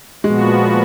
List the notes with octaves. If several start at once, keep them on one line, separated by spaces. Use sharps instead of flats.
A#2 F3 G#3 B3 F#4